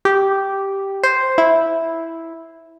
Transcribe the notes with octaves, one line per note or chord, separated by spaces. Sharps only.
G4
C5
E4